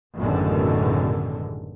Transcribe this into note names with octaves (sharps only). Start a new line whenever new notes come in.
A1 F#2 B2 D3 D#3 G#3